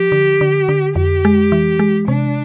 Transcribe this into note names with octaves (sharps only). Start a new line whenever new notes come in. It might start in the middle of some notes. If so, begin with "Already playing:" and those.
Already playing: F3 G4
D3
D3
D3
F2 G4
G#3
E3
G#3
C3 D4